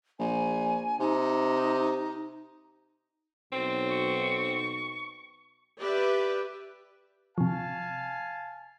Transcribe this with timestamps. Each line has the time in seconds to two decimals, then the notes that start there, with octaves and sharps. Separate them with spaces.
0.19 A#1 G#5
1.00 C3 D#4
3.53 B1 C4
3.89 C#6
5.80 G4 B4 D5 E5
7.38 C3 F3 F5 G#5 A5